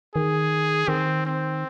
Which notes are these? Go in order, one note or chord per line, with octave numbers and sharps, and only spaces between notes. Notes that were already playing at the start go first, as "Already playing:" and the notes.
D#3 G#4
D#3 C4
C4